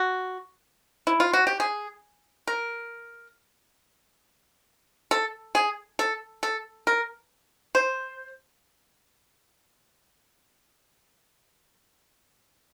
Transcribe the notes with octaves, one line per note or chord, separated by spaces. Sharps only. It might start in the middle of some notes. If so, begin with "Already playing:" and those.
Already playing: F#4
E4
F4
F#4
G4
G#4
A#4
A4
G#4
A4
A4
A#4
C5